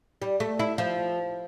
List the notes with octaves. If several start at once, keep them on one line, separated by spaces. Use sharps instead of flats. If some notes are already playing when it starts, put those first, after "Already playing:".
G3
A3
E4
F3